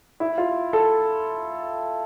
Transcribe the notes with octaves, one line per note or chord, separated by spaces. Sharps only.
E4
F4
A4